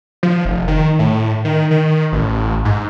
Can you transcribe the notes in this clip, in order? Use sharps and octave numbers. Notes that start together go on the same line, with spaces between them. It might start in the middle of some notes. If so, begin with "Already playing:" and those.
F3
F1
D#3
A2
D#3
D#3
A1
G#2